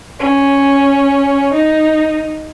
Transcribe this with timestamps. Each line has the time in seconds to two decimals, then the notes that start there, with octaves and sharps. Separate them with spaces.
0.19 C#4
1.54 D#4